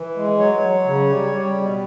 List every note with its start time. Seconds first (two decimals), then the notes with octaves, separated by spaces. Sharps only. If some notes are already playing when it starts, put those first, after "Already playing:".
Already playing: E3
0.16 G#3
0.38 F#3 C#5
0.62 F#3
0.85 C#3
1.09 G3
1.33 G3
1.56 B2